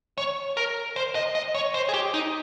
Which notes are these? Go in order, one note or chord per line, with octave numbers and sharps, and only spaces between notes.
C#5
A#4
C5
D#5
D#5
C#5
C5
G#4
G4
D#4